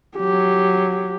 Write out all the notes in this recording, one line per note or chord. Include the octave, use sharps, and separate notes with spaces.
F#3 G4